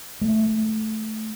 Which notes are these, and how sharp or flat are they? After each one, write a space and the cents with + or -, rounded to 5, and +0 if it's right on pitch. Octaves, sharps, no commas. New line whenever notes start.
A3 -5